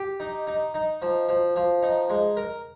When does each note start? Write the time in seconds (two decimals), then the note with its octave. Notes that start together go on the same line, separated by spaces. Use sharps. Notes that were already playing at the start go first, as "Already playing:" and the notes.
Already playing: G4
0.20 D#4
0.47 D#4
0.74 D#4
1.02 F3
1.29 F3
1.56 F3
1.82 D#4
2.09 G#3
2.37 A#4